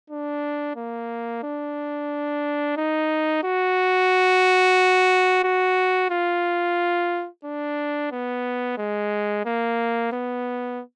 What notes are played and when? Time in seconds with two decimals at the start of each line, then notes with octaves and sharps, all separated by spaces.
0.10 D4
0.76 A#3
1.43 D4
2.77 D#4
3.44 F#4
5.44 F#4
6.11 F4
7.45 D4
8.11 B3
8.78 G#3
9.46 A#3
10.12 B3